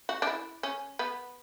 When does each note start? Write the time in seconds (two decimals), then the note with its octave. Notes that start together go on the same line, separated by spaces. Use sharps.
0.09 F#4
0.22 D4
0.27 E4
0.63 C#4
0.99 B3